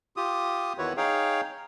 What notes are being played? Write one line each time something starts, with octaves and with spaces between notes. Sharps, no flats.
F4 G4 D#6
E2 D#3 E4 F#4 B4 C#5
D#4 G#4 C#5 F5 G5